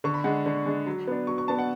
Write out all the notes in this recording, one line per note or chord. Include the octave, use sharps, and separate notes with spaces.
D3 C#6
B5
G#3 D4 F#5
D3
G#3 D4
F#3
B3 D4
F#3 C#6
C#6
B3 D4 A5
F#5